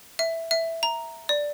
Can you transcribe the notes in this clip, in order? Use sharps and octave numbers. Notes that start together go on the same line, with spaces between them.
E5
E5
A#5
D5